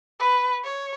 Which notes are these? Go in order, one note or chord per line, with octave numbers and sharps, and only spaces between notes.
B4
C#5